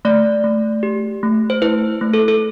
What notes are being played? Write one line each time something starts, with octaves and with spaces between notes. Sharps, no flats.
A3 D5
A3
G4
A3
C5
E4 B4
A3
A4
A4